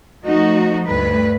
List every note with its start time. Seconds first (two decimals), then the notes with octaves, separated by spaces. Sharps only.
0.24 F3 A3 D#4 F#4
0.86 D2 G2 B4